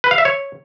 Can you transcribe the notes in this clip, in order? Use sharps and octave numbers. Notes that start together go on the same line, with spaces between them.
B4
F5
E5
C#5